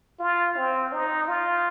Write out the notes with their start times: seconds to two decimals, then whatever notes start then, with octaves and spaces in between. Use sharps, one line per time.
0.19 F4
0.56 C4
0.92 D#4
1.28 F4